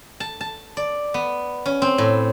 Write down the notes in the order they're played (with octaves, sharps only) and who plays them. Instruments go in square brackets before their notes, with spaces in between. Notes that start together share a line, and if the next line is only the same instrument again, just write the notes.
[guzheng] A5
A5
D5
B3
C#4
C4
A2